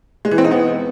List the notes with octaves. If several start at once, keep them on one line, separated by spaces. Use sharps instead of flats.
G#3
E3
C4
D#4
B3